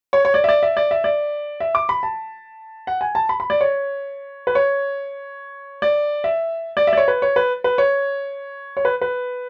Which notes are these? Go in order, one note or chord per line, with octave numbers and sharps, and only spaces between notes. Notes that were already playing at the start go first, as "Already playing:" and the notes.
C#5
C#5
D5
E5
D5
E5
D5
E5
D5
E5
D6
B5
A5
F#5
G#5
A5
B5
B5
D5
C#5
B4
C#5
D5
E5
D5
E5
D5
C#5
B4
C#5
B4
B4
C#5
C#5
B4
B4